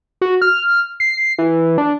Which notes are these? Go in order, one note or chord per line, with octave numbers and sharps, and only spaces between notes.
F#4
F6
C7
E3
D4